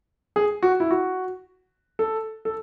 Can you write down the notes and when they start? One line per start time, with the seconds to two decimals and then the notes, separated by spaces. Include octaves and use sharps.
0.36 G#4
0.63 F#4
0.80 E4
0.91 F#4
1.99 A4
2.45 A4